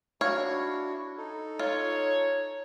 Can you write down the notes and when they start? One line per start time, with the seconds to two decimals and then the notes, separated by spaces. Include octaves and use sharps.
0.21 D4 E4 F#4 C#5 F5
1.18 D#4 A4
1.59 F4 C#5